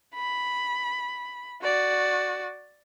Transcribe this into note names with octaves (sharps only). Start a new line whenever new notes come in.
B5
F#4 D5